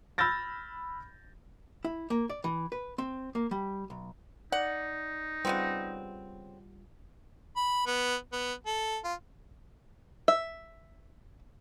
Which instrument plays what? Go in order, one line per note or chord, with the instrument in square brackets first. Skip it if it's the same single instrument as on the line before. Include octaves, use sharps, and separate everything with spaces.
[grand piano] B5 E6 F6 G6 A6 A#6
[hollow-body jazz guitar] E4
A#3
D5
E3
B4
C4
A#3
G3
B1
[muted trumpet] D#4 [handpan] D5 [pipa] F#5
[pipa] C#3 B3 C4 [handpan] G3 F4 F#5
[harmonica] B5
B3
B3
A4
F4
[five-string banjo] E5